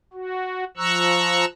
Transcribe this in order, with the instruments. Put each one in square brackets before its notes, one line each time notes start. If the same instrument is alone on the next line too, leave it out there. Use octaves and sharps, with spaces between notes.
[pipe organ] F#4
F3 A#5 C#6 E6 F#6